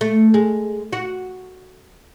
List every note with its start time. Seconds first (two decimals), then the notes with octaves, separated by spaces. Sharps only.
0.01 A3
0.34 G#3
0.93 F#4